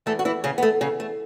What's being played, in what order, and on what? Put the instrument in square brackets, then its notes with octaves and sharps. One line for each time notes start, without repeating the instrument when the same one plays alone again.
[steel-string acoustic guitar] E2 E3 A3 A4
F#4
E3 E4
C#3 C#4
B3
A3
C#3 C#4
A3